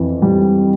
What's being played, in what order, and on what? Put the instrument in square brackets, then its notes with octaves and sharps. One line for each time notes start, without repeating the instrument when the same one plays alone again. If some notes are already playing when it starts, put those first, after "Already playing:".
Already playing: [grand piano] F2 E3
G3